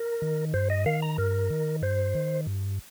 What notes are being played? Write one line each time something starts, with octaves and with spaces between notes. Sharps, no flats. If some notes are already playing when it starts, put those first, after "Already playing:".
Already playing: A#4
D#3
G2 C5
D#5
D#3 F5
A#5
G2 A#4
D#3
G2 C5
D#3
G2